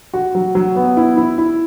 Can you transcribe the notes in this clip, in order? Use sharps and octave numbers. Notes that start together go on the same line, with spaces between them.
F#4
F#3
F#3
B3
E4
E4
E4